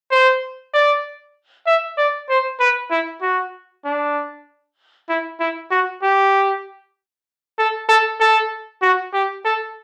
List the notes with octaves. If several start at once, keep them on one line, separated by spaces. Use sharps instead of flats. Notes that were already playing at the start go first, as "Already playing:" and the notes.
C5
D5
E5
D5
C5
B4
E4
F#4
D4
E4
E4
F#4
G4
A4
A4
A4
F#4
G4
A4